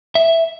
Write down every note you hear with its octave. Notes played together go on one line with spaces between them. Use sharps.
E5